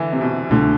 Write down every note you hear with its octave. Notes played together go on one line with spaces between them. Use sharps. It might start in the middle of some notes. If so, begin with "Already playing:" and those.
Already playing: D3 E3
C3
B2
C2 B2 D3 A3 D4